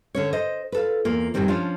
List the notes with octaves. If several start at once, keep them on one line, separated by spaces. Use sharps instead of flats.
D3 C#4 C#5
C5 D#5
F4 A4 B4
E2 A#3 F4
F#2 A2 D#3 F#3 G3 C4
F3 C#4 D4 F4